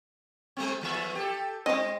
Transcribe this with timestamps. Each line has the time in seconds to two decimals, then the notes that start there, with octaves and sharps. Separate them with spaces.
0.57 G3 A3 C4
0.81 E2 F3 E5
1.15 G4 A4
1.66 G#3 C4 D#5